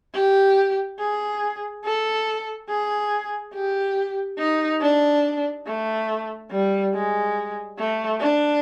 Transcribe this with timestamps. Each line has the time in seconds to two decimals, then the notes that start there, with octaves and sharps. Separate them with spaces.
0.14 G4
0.99 G#4
1.84 A4
2.69 G#4
3.54 G4
4.38 D#4
4.81 D4
5.67 A3
6.51 G3
6.94 G#3
7.79 A3
8.21 D4